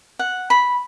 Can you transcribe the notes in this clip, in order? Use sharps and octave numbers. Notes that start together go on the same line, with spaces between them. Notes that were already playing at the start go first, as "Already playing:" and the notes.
F#5
B5